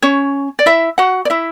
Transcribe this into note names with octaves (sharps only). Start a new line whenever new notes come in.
C#4 C#5
D5
E4 E5
F#4 F#5
D5
E4 E5